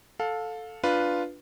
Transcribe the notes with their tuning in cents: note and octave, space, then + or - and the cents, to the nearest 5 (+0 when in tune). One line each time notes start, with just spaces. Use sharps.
A4 +0 F5 +25
D4 +0 F4 +0 B4 +0